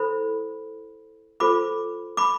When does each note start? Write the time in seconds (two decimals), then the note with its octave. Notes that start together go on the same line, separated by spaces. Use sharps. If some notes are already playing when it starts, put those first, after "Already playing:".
Already playing: E4 A4 C5 B5
1.40 F4 A4 C5 B5 D6
2.17 B5 D6